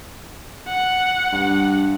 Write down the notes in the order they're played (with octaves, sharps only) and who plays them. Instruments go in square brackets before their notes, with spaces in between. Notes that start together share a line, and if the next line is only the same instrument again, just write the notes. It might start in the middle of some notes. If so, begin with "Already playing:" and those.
[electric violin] F#5
[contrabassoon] G2